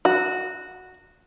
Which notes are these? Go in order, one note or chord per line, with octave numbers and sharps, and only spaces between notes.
F#4